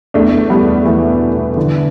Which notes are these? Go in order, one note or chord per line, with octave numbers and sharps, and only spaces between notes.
E2 A3 D4
E2
G3 B3
E2
E3 A3 B3
B2
B3
D3 E3